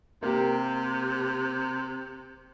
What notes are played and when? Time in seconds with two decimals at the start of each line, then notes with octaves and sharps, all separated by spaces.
0.23 C3 A#3 G4